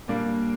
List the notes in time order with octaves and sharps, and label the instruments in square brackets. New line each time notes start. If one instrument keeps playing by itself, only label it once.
[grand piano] A#2 G3 A#3 D4